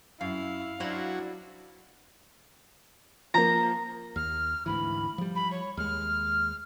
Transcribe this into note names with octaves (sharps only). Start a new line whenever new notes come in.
F#2 E4 F5
F#3 D4 E4 F#4 C5
F3 A#3 A#5
D#2 F6
D2 G#2 E3 B5
F3 G3
B5
C#5
D#2 G#3 F6